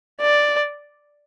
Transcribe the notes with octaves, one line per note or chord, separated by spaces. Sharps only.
D5